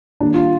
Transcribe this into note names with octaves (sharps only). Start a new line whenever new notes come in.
D#3 G3 A#3 D4
F4